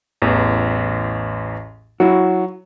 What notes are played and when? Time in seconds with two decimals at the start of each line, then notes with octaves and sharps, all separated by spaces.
0.22 A1 E2
2.00 F#3 E4 F#4